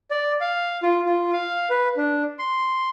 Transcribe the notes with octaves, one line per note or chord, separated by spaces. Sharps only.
D5
F5
F4
F4
F5
B4
D4
C6